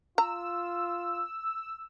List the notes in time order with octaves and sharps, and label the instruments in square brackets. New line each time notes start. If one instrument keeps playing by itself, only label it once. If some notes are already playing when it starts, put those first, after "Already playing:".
[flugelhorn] F4 [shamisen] A#5 [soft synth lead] E6